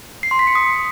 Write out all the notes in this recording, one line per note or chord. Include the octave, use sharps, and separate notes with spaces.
C7
C6
B6
C#7
D#6